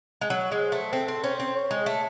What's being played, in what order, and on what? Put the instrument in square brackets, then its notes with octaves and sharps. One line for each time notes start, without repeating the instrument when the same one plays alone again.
[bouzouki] G#3
[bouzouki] F#3 [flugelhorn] C#5
[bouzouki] G#3
[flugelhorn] C5
[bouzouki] A3
[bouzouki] C4 [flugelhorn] A4
[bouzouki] C4
[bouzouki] C#4 [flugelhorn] C5
[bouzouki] C4
[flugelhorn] C#5
[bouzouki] G#3
A3